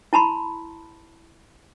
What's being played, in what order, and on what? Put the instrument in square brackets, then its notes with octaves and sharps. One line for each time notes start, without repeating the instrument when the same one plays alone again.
[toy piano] E4 A5 B5 C6